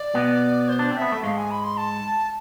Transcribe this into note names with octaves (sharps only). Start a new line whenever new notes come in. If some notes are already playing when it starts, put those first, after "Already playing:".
Already playing: D5
B2 B3
C5
D4
C4
B3 E5
A3
G#2 G#3 F5
G#5
B5
C6
A5